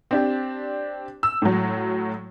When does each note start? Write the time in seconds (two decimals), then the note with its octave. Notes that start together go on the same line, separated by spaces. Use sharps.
0.11 C4 D4 G4
1.23 E6
1.42 A2 F#3